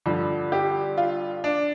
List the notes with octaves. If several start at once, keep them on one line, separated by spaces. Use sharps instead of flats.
G2 D3 F3
G4
F4
D4